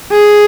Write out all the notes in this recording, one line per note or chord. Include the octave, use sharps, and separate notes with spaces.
G#4